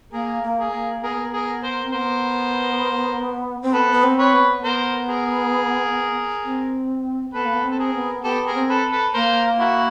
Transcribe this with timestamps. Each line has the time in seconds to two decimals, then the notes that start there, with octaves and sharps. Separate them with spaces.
0.13 A#3 G#4 A#4
0.43 A#3
0.58 G#4 A#4
0.72 A#3
1.03 B3 G#4 A#4
1.33 G#4 A#4
1.63 A#4 C5
1.83 C4
1.93 B3 A#4 C5
3.62 C4
3.73 B3 A4 B4
3.91 B3
4.04 C4
4.18 B4 C#5
4.34 B3
4.63 B3 A#4 C5
5.09 G#4 A#4
6.44 C4
7.33 B3 A4 B4
7.45 A#3
7.54 B3
7.64 C4
7.71 A4
7.79 G#4 A#4
7.95 B3
8.24 B3 G4 A4
8.47 G#4 A#4
8.54 C4
8.69 A4 B4
8.91 A4 B4
9.14 A#3 A#4 C5
9.59 E4 F#4